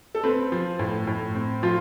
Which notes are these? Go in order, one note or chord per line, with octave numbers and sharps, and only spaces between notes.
A4
C4 B4
F3
A2
A2
C4
F3 F4